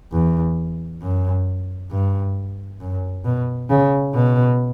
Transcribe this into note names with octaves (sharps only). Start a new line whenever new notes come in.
E2
F#2
G2
F#2
B2
C#3
B2